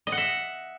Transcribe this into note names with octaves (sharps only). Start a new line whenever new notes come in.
D#5
F#5
E5